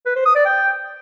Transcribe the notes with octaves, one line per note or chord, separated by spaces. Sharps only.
B4
C5
D#6
D5
G5